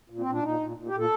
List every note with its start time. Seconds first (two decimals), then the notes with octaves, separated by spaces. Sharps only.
0.10 A#2
0.19 C4
0.26 A#2
0.31 D4
0.43 A#2 D#4
0.60 A#2
0.77 A#2
0.88 G4
0.92 A#2
0.98 A4